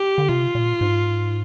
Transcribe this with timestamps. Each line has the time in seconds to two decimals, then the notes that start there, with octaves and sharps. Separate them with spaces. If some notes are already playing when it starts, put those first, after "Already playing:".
Already playing: G4
0.18 D3
0.29 C3 F4
0.55 A#2
0.81 G#2